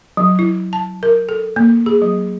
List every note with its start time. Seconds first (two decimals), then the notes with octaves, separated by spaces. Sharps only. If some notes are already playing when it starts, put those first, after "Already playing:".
0.17 F#3
0.39 E4
0.73 A5
1.03 A#4
1.29 A4
1.56 A#3
1.86 G#4
2.02 F#3